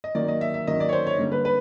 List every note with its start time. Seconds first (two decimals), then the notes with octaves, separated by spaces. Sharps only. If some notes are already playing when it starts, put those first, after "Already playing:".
0.04 D#5
0.15 D#3 F#3 A#3 D5
0.28 D#5
0.41 E5
0.54 E5
0.67 D#3 F#3 A#3 D#5
0.80 D5
0.89 C#5
0.93 C5
1.07 C#5
1.18 D3 G3 A#3
1.32 B4
1.45 B4